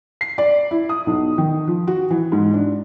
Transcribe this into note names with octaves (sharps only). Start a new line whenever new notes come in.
C7
D5
E4
D#6
B1
D#3
F3
F#4
E3
G#2
D4